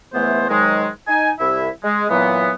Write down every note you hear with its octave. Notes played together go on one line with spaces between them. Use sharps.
C#2 E3 A3 B3 C5
G#2 D#3 F#3 G#3
D#4 G#5
C2 E4 E5
G#3
A#2 E3 F#3 B3